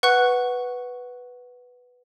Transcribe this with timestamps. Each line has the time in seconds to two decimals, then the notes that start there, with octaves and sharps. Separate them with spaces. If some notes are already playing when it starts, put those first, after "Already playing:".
0.03 B4 F#5 C#6 F#6